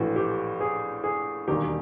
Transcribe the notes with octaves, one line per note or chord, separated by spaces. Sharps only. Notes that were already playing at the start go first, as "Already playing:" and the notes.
Already playing: A#1 A2 E3 F#4
G4
G#4
G#4
E1 D#2 D#3 G3 G4